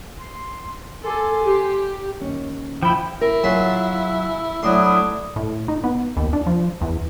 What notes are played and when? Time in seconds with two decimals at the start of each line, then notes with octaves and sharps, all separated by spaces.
0.20 C6
1.04 A4 G#5 C6 D6
1.43 G4
2.20 D#2 C#4
2.82 F3 E4 G5 B5
3.21 E4 A#4
3.44 F#3 F4 G#4 E5 C6
4.63 F#3 A3 D4 E4 C6 D#6
5.36 A2
5.68 D#4
5.84 B3
6.17 D#2
6.33 D4
6.46 F3
6.81 E2